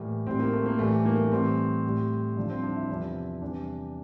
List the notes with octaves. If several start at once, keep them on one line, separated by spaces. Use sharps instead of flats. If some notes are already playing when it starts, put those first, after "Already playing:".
Already playing: A2 E3 G3 A#3
A2 G3 C4
A#3
A3
A#3
A2 E3 G3 A3
A#3
A#3
A2 E3 G3 C4
A2 G3
G2 D3 F3
C4
D4
E4
E2 C3 F3
E2 C3 E3 G3 D4